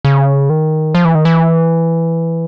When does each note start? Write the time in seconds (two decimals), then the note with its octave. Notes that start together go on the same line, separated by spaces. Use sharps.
0.05 C#3
0.49 D#3
0.95 F3
1.05 E3
1.15 D#3
1.25 E3